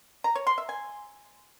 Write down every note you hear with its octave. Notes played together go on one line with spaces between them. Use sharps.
A#5
C#5
C6
E5
G#5